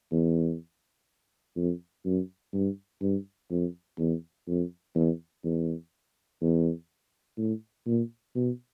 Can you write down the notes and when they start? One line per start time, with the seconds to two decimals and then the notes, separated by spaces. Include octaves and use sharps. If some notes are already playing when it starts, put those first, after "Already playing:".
0.11 E2
1.56 F2
2.05 F#2
2.54 G2
3.01 G2
3.50 F2
3.98 E2
4.48 F2
4.95 E2
5.44 E2
6.41 E2
7.38 A2
7.86 A#2
8.35 B2